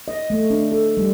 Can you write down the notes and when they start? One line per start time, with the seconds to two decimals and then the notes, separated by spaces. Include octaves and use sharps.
0.08 D#5
0.30 A3
0.50 D4
0.72 A4
0.97 G3